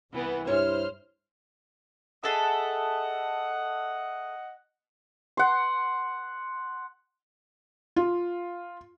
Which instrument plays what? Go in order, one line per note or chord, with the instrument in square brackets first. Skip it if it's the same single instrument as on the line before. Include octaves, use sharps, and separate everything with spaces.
[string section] C2 E3 B3
[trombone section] G2 E4 [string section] C5 F6 [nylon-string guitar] C#5
[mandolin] G#4 A4 E5 [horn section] D#5 F#5
[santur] F#5 C6
[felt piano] F4